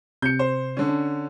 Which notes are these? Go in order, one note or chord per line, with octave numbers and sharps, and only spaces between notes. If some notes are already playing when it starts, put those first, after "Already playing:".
C3 G6 C#7
C5
D3 C#4
D4